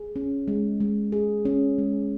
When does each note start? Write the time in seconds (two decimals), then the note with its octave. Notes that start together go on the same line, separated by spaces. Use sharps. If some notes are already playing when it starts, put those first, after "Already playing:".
Already playing: G#4
0.16 C#4
0.48 G#3
0.80 G#3
1.12 G#4
1.45 C#4
1.78 G#3